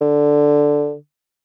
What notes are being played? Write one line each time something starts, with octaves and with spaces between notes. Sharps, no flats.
D3